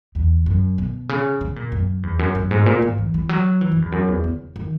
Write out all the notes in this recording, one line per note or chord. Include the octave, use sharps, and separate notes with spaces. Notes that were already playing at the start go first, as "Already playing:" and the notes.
E2
F#2
B2
C#3
C#3
A#2
F#2
E2
F#2
F#2
G#2
A#2
G#2
E3
E3
F#3
E3
F#2
E2
F#2
E2
C#3
D#3